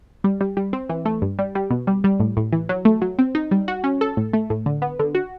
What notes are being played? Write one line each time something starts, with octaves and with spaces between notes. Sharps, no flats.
G3
G3
G3
C4
E3
A3
G2
G3
G3
B2
G3
G3
A2
A2
E3
F#3
A3
F#3
C4
D#4
G3
F#4
C#4
A4
A2
A3
A2
D3
B3
D3
F#4